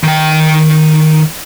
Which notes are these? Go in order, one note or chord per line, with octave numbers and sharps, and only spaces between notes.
D#3 G5